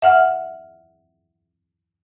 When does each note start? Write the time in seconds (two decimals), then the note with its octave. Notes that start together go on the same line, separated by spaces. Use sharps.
0.02 E5 F#5 F6